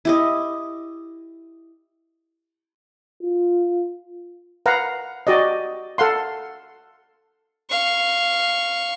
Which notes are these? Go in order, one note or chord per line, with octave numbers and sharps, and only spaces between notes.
E4 G4 D#5
F4
B4 F5 F#5 A#5
F#4 G4 D5 D#5
A4 F5 F#5 C6
F5 C#6